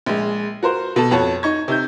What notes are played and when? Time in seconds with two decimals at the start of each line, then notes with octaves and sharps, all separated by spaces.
0.06 A#1 G#3
0.63 F#4 A#4 C5
0.96 B2 A4 A5
1.11 F2 F#4 C#5 A5
1.43 D#4 C#6 G#6
1.68 C3 D#4 G6